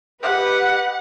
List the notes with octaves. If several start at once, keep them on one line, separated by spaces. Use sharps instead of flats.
G4 B4 D#5 F#5